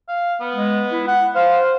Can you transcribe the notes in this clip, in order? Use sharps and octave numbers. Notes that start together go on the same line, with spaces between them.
F5
B3
G#3
E4
F#5
C5 F5